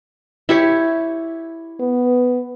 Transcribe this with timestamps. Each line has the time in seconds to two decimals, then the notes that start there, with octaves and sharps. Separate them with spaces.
0.49 E4 G4 C#5
1.80 B3